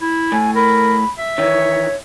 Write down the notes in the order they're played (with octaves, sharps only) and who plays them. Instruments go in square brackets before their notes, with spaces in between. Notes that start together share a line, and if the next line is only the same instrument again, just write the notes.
[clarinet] E4
[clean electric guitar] A2 [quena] G#5
[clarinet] A#4 [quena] B5
[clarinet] E5
[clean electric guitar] D#3 E3 [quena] C#5